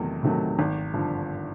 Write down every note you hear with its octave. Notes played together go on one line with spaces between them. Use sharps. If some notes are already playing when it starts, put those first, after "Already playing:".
Already playing: E2 C3 D#3 F#3 A3
C3 D#3 F#3 A3
G#1
G2 D3 F3